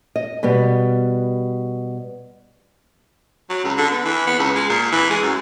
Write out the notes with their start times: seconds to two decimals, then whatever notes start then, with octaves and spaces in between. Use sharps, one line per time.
0.16 D#5
0.43 B2 G3 B3
3.50 F#3
3.64 C#2
3.77 D3
3.91 B3
4.05 E3
4.27 B3
4.39 C#2
4.55 G#3
4.69 A#2
4.92 E3
5.10 G#3
5.22 F#2